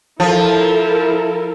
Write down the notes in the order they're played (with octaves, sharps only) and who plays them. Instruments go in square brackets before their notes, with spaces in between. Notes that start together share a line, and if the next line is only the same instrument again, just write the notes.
[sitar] F3 [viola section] E4 A4 A#4